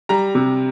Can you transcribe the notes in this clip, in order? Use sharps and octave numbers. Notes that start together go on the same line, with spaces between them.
G3 A#5
C3